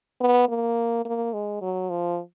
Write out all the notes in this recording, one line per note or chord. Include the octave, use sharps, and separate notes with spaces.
B3
A#3
A#3
G#3
F#3
F3